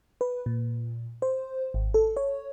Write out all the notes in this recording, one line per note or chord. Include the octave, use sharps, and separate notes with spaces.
B4
A#2
C5
G#1
A4
C#5